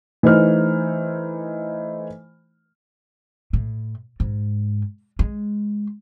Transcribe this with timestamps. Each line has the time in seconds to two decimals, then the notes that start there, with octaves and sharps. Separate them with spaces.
0.23 E3 A3 D#4 C5 F6
3.53 A2
4.20 G#2
5.19 G#3